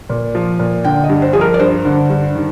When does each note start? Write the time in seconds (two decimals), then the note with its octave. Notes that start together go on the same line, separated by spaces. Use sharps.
0.10 A#2
0.35 F3
0.59 A#2
0.84 D3 G5
1.04 D#5
1.10 G2
1.22 C5
1.33 F3 G#4
1.41 A#4
1.54 D5
1.60 G2 C5
1.85 D3
2.10 G2
2.35 D#3